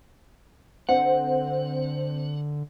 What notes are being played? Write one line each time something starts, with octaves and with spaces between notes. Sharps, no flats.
D3 C4 F#5